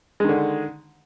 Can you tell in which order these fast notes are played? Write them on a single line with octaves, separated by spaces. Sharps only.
G#3 D#3 D3